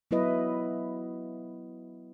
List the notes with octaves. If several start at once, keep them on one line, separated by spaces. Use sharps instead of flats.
F#3 B3 E4 B4 D#5